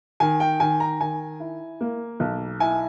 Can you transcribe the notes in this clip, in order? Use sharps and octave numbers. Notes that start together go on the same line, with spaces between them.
D#3 G#5
G5
D#3 G#5
A#5
D#3 G#5
E4
A#3
B1
E4 G#5